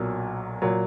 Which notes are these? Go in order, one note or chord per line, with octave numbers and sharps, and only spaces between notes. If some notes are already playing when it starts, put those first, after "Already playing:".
Already playing: B1 A#2 F#3
A#2 F#3